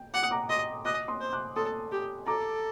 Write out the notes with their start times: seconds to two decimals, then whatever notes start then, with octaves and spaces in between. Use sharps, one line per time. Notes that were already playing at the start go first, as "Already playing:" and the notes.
Already playing: G5
0.14 F#5 D6
0.23 D#6
0.31 A#5 D6
0.49 D#5 C6 D#6
0.85 D#5 D6 F#6
1.08 C6 D#6
1.21 C5
1.33 D6 F#6
1.56 A4 C6 D#6
1.92 G4
2.27 A4 A#5 D6